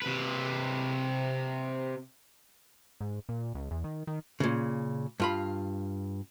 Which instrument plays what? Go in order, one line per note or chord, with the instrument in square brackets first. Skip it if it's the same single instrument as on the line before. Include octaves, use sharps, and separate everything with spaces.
[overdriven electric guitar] C3 B4
[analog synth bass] G#2
A#2
C#2
E2
D#3
D#3
[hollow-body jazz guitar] A#2 C#3
G2 F4 B5